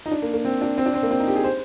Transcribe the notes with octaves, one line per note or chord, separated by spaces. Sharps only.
D#4
D4
A#3
A#3
C4
D4
C4
D4
C4
A#3
C4
D#4
G4
G#4
C5